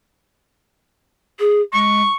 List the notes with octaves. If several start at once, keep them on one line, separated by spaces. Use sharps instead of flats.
G#4
G#3 C#6